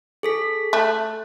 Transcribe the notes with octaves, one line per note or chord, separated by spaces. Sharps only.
G#4 A4 B6
A3 F#6